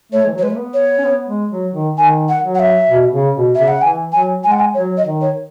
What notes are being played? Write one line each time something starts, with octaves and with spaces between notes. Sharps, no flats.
A3 C#5
E3
F#3
C#5
G#3 B4
A3
B3
C#5
C#4
B3
G#3
F#3
D#3
D#3 G#5
F#5
F#3
F#5
E5
B2
C#3
B2
C#3 E5
F#5
E3 G#5
F#3 G#5
G#3 G#5
F#5
G#5
F#3 C#5
D#5
D#3
C#5